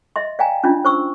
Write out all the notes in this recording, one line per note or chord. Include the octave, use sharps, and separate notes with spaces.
D#5 E5 C6
D5 F5 G5 G#5 A#5
C#4 D4 E4 F4
C5 C#6 E6